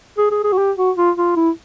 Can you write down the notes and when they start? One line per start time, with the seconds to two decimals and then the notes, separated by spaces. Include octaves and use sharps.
0.18 G#4
0.31 G#4
0.44 G#4
0.52 F#4
0.58 G4
0.77 F#4
0.97 F4
1.18 F4
1.36 E4